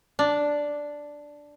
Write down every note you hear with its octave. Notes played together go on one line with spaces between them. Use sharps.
D4